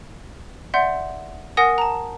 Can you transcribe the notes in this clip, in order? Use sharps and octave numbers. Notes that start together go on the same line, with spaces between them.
D5 E5 F#5 C6 G6
A#4 F#5 G#5 D#6 A#6
A5 A#5